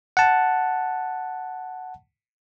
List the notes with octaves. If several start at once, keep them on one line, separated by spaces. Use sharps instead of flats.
F#5 A5